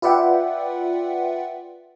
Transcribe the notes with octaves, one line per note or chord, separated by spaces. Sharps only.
F4 B4 D5 E5 F#5 G5